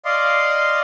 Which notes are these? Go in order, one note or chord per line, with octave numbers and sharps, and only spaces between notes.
D5 D#5 F5 C6